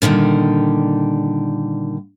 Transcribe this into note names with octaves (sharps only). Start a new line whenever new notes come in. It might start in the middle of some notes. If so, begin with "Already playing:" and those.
A#2 D3 D#3 G3